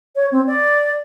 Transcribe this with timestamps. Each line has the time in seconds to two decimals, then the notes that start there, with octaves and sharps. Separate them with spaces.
0.15 C#5
0.32 C4
0.47 D5